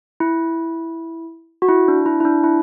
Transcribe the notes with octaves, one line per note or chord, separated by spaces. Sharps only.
E4
F#4
E4
D4
E4
E4
D4
E4